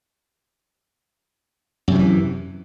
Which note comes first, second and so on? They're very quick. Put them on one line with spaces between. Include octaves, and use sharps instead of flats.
F#2 C3 F3 E3